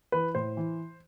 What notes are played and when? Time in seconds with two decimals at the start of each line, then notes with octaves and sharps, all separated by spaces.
0.12 E3 B4
0.35 A2 C5
0.57 E3